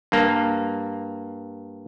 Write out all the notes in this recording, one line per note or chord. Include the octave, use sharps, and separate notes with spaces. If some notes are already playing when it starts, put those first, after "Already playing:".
G2 A#3